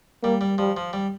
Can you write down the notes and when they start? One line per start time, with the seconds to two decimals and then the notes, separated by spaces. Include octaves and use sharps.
0.23 G3 A#3
0.41 G3
0.58 F3 G3
0.77 F3
0.93 G3